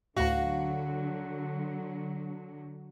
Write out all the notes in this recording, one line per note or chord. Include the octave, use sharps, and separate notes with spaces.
D2 A2 D3 F#3 F#4 F5